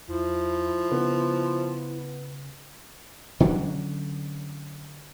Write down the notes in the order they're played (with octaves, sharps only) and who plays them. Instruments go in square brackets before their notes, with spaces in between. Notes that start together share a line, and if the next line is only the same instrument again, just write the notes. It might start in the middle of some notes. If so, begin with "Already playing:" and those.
[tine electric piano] E2 [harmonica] F3 [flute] E4
[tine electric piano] C#3 [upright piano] B3
[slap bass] D3 F#3 C#4 D4